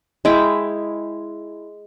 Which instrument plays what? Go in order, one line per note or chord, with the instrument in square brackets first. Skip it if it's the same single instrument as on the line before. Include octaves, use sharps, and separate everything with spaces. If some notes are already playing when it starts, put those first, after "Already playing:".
[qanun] G#3 E4 G5